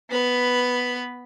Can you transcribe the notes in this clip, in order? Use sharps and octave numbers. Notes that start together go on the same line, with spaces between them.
B3 B4